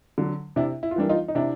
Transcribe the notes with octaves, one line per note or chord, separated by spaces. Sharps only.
D3 F#3
C3 D4 E4
E4
F4
E3 G3 A#3 D4 E4
D#4 F4
D#4
C3 D4 E4